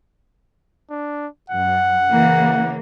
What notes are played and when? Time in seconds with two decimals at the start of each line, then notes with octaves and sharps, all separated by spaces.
0.90 D4
1.50 F#2 F#5
2.07 C#3 E3 A#3